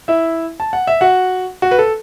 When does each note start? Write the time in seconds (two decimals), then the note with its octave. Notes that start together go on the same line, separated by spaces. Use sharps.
0.08 E4 E5
0.60 A5
0.73 F#5
0.87 E5
1.01 F#4 F#5
1.62 F#4
1.71 B4
1.79 A4